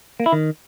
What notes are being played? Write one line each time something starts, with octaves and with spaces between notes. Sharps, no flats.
A#3
E4
D#3